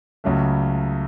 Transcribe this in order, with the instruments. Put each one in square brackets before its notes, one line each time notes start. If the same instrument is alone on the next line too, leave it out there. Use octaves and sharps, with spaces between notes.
[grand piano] C#2 C#3 F#3 A3